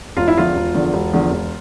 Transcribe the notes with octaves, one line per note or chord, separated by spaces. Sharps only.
E1 F4
E4
E2 D3 F3 F4
E1
E2 D3 F3
E1
E2 D3 F3
E1